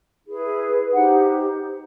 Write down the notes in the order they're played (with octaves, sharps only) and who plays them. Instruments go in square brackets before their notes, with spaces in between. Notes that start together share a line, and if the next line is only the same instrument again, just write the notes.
[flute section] E4 G#4 B4
D#4 G4 C5 F#5